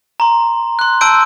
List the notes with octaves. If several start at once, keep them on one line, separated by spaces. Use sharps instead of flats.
A#5 C6
C6 F#6
A5 C6 E6 G6 D7